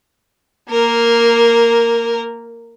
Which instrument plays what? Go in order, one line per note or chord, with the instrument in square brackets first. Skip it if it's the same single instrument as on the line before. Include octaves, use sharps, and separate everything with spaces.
[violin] A#3 A#4